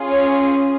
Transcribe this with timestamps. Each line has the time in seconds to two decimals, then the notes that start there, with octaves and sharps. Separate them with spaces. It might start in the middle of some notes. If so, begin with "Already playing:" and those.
Already playing: C#4 F4 G#4
0.11 C#5